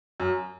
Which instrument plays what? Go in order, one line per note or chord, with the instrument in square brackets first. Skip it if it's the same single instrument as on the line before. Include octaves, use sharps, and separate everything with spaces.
[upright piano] F#2